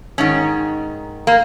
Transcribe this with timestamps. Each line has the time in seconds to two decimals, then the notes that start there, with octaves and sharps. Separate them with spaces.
0.18 G#2 D#3 C#4
1.27 A#3